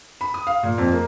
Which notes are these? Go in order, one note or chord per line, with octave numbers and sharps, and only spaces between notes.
B5
D#6
F5
A#2
F2
A#3